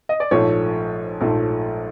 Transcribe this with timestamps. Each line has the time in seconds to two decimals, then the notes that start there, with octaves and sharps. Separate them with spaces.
0.09 D#5
0.20 D5
0.31 A#1 G#2 F3 A3 C#5
1.20 A#1 G#2 F3 A3